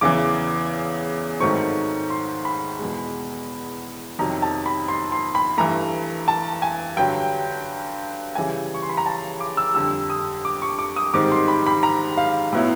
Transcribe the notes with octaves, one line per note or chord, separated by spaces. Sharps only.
E2 C#3 E3 D6
G#2 D#3 F#3 A3 C4 C#6
C6
B5
E2 B2 G#3
F2 C3 D#3 F#3 A#5
A5
B5
C6
C6
B5
G2 E3 A3 A#5
A5
G#5
G2 D3 F#3 G5
C#3 E3 G3 G#5
C#6
C6
B5
A#5
A5
D6
E6
F2 D3 G3 E6
D#6
D6
C#6
D6
D#6
G#2 D#3 G3 C4 D6
C6
B5
B5
A#5
F5
A2 F#3 B3 E4